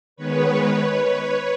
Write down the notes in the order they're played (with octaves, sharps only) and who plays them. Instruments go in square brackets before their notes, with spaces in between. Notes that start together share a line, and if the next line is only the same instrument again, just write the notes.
[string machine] D#3 G#3 B3 B4 C#5